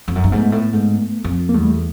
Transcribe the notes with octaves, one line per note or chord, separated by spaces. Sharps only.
F2
F#2
G2
G#2 A3 B3
A2
G#2
F2
A#3
E2 G3 A3